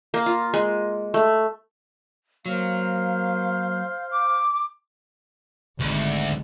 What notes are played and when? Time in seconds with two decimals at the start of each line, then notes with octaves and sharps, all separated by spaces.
0.14 A#3
0.26 F4
0.54 G#3
1.14 A3
2.46 F#3 A#3 C5 F5 F6
4.12 D6
5.80 G#1 D2